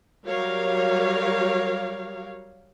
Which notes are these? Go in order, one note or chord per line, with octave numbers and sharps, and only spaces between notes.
F#3 G3 A#4 C#5 F5